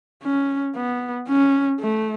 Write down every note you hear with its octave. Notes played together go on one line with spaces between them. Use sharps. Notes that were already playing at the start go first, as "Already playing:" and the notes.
C#4
B3
C#4
A3